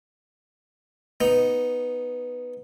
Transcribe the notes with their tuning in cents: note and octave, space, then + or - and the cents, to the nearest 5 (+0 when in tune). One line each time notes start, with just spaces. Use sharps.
B3 +0 D#4 +0